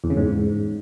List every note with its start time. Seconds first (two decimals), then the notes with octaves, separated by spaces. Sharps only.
0.04 E2
0.10 C#3
0.17 G#2